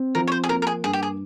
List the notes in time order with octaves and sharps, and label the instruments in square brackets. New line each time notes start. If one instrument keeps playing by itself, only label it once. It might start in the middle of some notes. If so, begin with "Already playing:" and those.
Already playing: [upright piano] C4
[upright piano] F3 [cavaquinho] A#4
[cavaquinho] C#5
C5
G#4
[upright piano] A#3 [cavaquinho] A#4
[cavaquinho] A#4
G#4
[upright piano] G2 [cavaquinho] G#4
[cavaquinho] G4
G#4